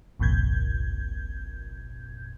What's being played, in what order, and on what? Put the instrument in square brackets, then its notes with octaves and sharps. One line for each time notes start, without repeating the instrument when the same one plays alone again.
[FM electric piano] G1 C2 F2 A#2 G6 G#6